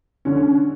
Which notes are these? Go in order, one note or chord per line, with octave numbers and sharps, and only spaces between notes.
D3 C#4